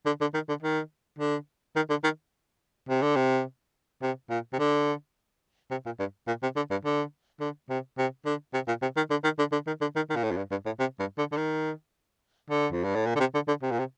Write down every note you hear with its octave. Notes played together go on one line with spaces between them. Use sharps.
D3
D3
D#3
D3
D#3
D3
D#3
D3
D#3
C3
D3
C3
C3
A#2
C3
D3
C3
A#2
G2
A#2
C3
D3
G2
D3
D3
C3
C3
D3
C3
A#2
C3
D#3
D3
D#3
D3
D3
D#3
D3
D#3
D#3
A#2
A2
F2
G2
G2
A2
C3
G2
D3
D3
D#3
D3
F2
G2
A2
A#2
D3
C3
D3
D3
C3
A#2
C3